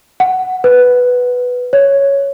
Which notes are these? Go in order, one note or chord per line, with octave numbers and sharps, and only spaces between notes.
F#5
B4
C#5